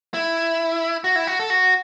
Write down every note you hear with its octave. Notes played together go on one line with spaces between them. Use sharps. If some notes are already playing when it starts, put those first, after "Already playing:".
E4
F#4
E4
F#4
A4
F#4